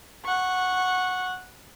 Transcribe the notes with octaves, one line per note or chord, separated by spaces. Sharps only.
F#5 C#6